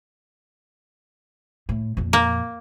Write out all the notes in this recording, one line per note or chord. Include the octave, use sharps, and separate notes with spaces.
A2
F2 A#2
A#3